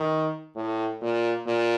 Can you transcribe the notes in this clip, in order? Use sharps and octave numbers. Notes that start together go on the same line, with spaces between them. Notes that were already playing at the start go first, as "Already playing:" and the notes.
Already playing: D#3
A2
A#2
A#2